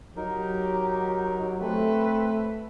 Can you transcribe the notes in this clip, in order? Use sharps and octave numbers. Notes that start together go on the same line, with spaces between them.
F#3 D#4 G4 A#4
A3 C4 A4 B4